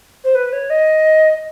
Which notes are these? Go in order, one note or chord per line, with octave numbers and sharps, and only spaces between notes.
C5
B4
C#5
D#5